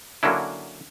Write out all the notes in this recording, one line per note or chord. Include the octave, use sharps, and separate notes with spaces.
D3 F#3 A#3 C#4 D4 E4